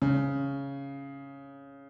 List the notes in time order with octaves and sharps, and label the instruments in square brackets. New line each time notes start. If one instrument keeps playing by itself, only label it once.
[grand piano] C#3